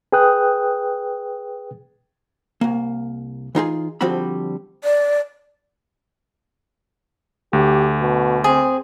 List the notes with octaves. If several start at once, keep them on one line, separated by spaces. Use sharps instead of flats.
G#4 B4 G5 D#6 F#6
C2 A#3
E3 D#4 F4 G#4
D3 F3 G3 C4 F#4 B5
D5
D2 G4
B2
C4 G#4